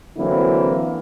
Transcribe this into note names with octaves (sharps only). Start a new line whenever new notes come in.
D3 E3 F#3 A#3 C4 E4